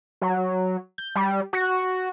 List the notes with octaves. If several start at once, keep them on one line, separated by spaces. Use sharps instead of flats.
F#3
G6
G3
F#4